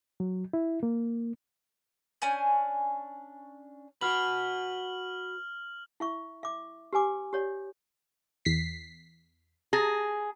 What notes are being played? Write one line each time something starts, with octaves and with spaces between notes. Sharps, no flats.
F#3
E4
A#3
C#4 D4 G#5 G6
F#4 B4 F6 F#7
E4 E5 C#6
E5 D6
G4 B4 G#5 D6
G4 C#5 D5
E2 B6 C7
G#4 A5 A#5